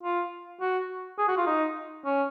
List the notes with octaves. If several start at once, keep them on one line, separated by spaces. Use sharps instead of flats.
F4
F#4
G#4
F#4
F4
D#4
C#4